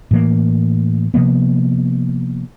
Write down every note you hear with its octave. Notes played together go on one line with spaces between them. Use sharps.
A2 E3 A#3
C3 F3 A#3 B3